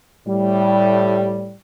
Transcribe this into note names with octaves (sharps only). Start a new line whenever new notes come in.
A2 G3